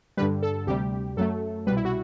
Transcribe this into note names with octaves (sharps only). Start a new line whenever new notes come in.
G2 D3 G3 B4
A4
D2 C3 G3 G4
F#2 F#3 A3 A4
C2 B2 G3 B4
E4
F#4